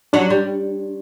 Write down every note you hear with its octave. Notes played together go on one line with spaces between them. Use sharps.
F#3 D4
G3